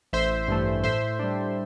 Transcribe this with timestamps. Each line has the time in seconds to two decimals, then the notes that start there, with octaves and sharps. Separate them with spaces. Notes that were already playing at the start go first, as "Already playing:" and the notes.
0.13 A1 C5 E5
0.48 G2 E3 A3
0.84 A2 C5 E5
1.19 G3 D4